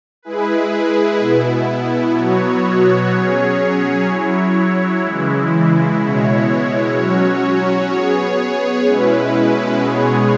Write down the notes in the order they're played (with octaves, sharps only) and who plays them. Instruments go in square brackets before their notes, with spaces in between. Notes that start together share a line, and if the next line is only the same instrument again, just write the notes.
[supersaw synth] G#3 E4 G#4 B4
B2 B3 E4
B2 F#3 B3 F#4 C#5
F#3 C#4 G#4 C#5
F#3 E4 C#5
C#3 E3 G#3 E4
B2 G#3 E4 C#5
F#3 C#4 F#4 C#5
B3 G#4 C#5
B2 G#3 C#4 E4 B4
B2 G#3 B3 G#4 C#5